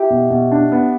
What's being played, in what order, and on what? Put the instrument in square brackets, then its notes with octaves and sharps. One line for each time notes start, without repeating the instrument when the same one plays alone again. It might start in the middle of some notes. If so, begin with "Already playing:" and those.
Already playing: [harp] E4 G4
[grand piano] B2
B2
D4
B3